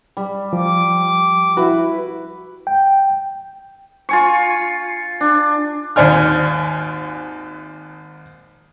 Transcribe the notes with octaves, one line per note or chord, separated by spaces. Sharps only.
G3
F3 D6
E4 F#4 B4
G5
F4 G#5 C#6
D4
G#1 D#2 C5 D5 G#5 F6